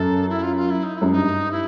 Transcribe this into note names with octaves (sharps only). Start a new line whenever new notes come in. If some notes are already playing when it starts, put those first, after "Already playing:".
Already playing: F#2 A4
E4
F4
F4
E4
D#4
F#2 E4
G2 D#4
E4